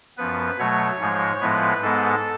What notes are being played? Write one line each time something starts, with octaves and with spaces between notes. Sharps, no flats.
F#2 F3 B3 B4
B2 F#3 A3 C#5
G#2 F3 G#3
A2 F3 G#3 B3 B4
G#2 G#3 B3 A4